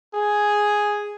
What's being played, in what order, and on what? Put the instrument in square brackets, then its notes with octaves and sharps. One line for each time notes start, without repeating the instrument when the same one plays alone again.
[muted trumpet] G#4